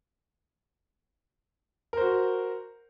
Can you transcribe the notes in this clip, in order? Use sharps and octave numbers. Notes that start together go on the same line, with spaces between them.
F#4 A#4 C5